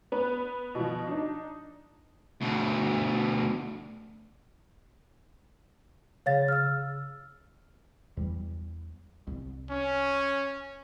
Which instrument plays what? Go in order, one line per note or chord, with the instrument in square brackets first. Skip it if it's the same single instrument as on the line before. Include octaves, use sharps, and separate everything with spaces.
[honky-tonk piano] B3 B4
B2 F3
D4 D#4
[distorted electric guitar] D2 B2
[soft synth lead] C#3 [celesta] C#5 F5 A6
[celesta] E6 F6
[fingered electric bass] E2 G3
C2
[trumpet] C#4